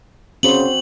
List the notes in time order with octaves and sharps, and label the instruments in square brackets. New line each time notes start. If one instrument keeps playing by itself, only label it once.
[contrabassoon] C#3 [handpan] C4 F#4 C5 [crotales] F#7